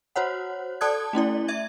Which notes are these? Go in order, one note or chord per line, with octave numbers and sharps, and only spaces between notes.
F#4 C5 C#5 F#5
A4 D5 A5 D#6 F#6 G#6
A3 C#4 E4 D5
E5 G#6